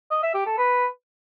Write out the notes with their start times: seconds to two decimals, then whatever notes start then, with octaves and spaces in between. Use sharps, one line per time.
0.11 D#5
0.22 E5
0.34 G4
0.46 A4
0.58 B4